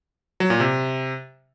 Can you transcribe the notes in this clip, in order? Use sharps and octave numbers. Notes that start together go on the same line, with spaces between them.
F#3
A#2
C3